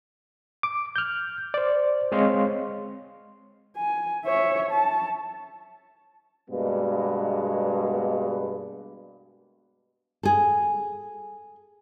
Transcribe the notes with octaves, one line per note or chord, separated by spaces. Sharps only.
D6
F6 G6
C5 D5
G#3 C4 C#5 D#5 F5 C6
G#5
C#5 E5
A5
G2 B2 G#3 A#3 B3
G#4 A4